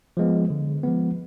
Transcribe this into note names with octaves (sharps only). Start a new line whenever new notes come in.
F3 G#3 B3
D3
F3 G#3 B3